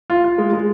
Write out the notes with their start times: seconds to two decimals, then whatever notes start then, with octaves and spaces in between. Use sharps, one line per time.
0.10 F4
0.24 F4
0.38 G#3
0.53 G#3